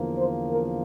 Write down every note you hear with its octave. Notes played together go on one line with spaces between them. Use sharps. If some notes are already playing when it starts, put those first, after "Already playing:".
Already playing: E2 D3 F3 A#3
C5
A#4